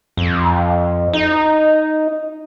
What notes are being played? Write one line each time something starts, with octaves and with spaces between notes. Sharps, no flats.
F2
D#4